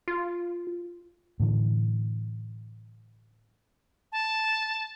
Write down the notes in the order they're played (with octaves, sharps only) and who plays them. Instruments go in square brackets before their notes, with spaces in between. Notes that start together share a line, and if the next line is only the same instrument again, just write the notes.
[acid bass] F4
[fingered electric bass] A2 D3 E3
[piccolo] A5